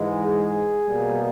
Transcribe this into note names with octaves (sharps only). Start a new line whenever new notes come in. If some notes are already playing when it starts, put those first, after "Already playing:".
Already playing: G#2 E3 G#3
G#4
B2 G3 A#3